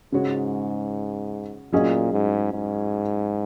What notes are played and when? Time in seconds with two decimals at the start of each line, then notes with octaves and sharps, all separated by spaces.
0.12 G#2 C#3 G#3 F#4 C#5
1.72 A#2 F#3 C#4 G#4 D#5
2.13 G#2
2.52 G#2